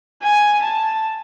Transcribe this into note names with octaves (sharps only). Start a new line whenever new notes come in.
G#5
A5